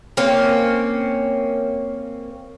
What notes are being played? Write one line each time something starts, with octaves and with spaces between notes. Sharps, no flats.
A#3 C4 C#4